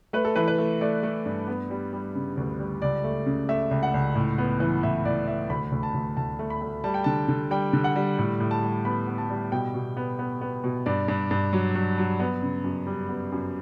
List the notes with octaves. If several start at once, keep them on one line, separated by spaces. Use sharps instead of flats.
A3 B4
A4
E3 B4
B4
A3
A3 D5
A3
G2
B3
G3
G3
C#3
D2
G3
C#2 D5
A3
C#3
A3 E5
C#2
F#5
C#2
A2
B3
E3
A2 E5
A2 D5
E3 E5
D2 B5
D2
A5
D2
D2 A5
A3
B5
A3
G3 A5
G5
D3 A5
D3
G3 G5
D3
F#5
G3
A2
A2
A5
G3
B3 B5
B3
A5
G3
B2 G5
B2
B3
B3
B3
B2
G2 D5
G2
G2
F#3
F#3
F#3
B3
C#3
F#2
G3
B3
F#2